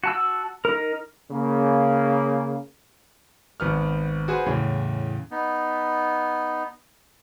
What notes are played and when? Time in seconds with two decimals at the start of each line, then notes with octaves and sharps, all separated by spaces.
0.04 F#4 A5 E6
0.65 D#4 A#4
1.31 C#3 A#3
3.60 G#1 B3 F6
4.28 F#4 G#4 B4 C5
4.46 E2 A2 C#3
5.31 B3 D#4